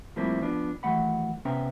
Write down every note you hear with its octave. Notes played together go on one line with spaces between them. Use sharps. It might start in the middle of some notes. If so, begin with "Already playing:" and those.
A2 F3 G3 A#3 C4 E4
F3 B3 D4
D#2 E3 F#3 A3 F#5 B5
C3 B3 C#4 E5 G5 A#5